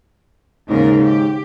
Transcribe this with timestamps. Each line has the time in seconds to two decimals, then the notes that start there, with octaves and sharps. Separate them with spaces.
0.70 D#2 G#2 C#3 A#4
1.03 G4